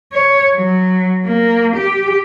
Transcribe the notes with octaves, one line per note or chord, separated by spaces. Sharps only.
C#5
F#3
A#3
G4